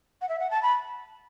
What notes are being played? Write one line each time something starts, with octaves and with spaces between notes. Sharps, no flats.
F#5
E5
F#5
A5
B5